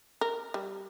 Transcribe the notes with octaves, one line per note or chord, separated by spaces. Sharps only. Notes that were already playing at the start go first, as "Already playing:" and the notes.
A#4
G3